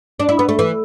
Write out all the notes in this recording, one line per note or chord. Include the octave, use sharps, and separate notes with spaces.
D4
E4
B3
A3
E3